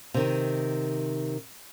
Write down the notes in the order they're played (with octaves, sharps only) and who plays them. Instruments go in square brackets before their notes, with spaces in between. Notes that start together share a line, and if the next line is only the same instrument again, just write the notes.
[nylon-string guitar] C3 D#3